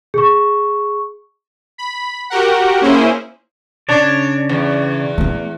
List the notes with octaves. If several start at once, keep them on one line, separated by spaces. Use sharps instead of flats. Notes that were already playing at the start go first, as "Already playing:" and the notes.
G#4 C#6
B5
F#4 G4 A#4 F#5
A#3 C#4 E4 G#4 C5
C#3 D4 C#5 D5
E2
A3 B3